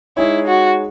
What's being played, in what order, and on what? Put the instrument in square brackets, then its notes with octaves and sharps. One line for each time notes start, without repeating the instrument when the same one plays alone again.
[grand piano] G#3 D#4 G#4 C#5 [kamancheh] E4
[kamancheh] F#4